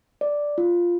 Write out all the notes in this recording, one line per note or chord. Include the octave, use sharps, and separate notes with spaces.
D5
F4